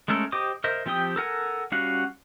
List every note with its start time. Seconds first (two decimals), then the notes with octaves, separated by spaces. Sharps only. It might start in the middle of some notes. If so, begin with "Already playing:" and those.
0.08 G#3 A3 C#4 A4 A#4
0.32 G4 C5 D#5 D6 D#6
0.64 A#4 C5 D#5 E5
0.86 F3 C4 G4 G5 D#6
1.16 A4 A#4 F#5 G#5
1.72 G3 C#4 F#4 F5 F#5